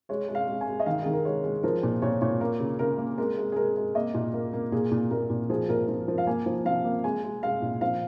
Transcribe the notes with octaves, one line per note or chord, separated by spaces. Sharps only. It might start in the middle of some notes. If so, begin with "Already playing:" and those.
G#3 C#5
G#3
F5
G#3
G#5
G#3
D#5
D#3 F5
D#3 G#4
A#4
G#3 C#5
G#3
F3 A#4
A#2
A#2 C#5
A#2 C#5
A#3 A#4
C#3
C#3 A#4
A#3
G#3 A#4
G#3
G#4
G#3 A#4
G#3
A#3 D#5
A#2
A#3 A#4
A#3
A#2 G#4
A#2
A#2 A#4
A#2
F3 G#4
A#2 A#4
F3
F3 A#4
F5
A#3 G#5
F3
F3 F5
A#3
G#3 G#5
G#3
G#3 F5
A#2
F3 F5